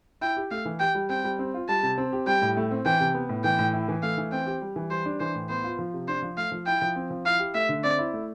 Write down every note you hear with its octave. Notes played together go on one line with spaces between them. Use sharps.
E4 G5
G4
A3 F5
E3
G4 G5
G3
C4 G5
G3
C4
F4
G3 A5
C3
C4
G4
G3 G5
A2
A3
C4
E3 G5
C3
B3
A2
E3 G5
A2
E4
E3
A3 F5
E3
C4 G5
G4
G3
E3
G3 C5
D4
E3 C5
A2
B3 C5
F4
F3
C3
D4 C5
F3
A3 F5
F3
E4 G5
F3
C4
F3
E4 F5
G4
A3 E5
D3
C4 D5
E4
A3